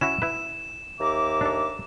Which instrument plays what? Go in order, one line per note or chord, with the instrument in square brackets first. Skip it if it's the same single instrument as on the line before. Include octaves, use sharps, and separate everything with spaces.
[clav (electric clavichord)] C#4 E4 F#4 [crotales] E7
[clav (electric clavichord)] E4 B4
[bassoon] D#2 [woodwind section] E5 A#5 D6
[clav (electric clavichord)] D4 A4